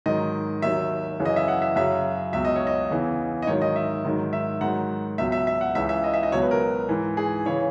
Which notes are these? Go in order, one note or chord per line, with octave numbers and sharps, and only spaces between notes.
G#2 D#3 F#3 D#5
D#2 D#3 F#3 E5
F#2 C#3 E3
D#5
E5
F#5
E5
F#2 C#3 F#3 E5
C#2 B2 F#3 E5
D#5
C#5
D#5
E2 C#3 E3
D#5
G#2 D#3 F#3 C#5
D#5
E5
G#2 D#3 F#3
E5
G#2 D#3 F#3 F#5
C#2 B2 F#3 E5
E5
E5
F#5
C#2 C#3 E3 E5
E5
D#5
E5
D#5
C#2 B2 F#3 C#5
B4
A#4
G#2 E3
G#4
C#3 E3 C#5